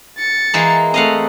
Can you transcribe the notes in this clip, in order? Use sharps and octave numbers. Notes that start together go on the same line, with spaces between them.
A6 C#7
E3 G#3 A#3
A3 C4 D#5 F5 F#5